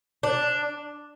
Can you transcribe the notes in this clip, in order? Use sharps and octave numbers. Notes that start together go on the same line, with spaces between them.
D4